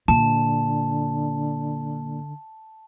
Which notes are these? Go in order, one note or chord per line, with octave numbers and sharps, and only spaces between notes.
A#2 D3 A5